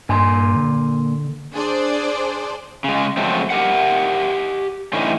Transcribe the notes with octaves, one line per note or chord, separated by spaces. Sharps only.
G2 A#2 G#5 C6
D3
D4 G#4 C5 D5
C#3 G#3
C#3 F3 F#3 G#3 A3 C4
G4 A#4 F#5
A2 D3 E3 A3 C#4 D#4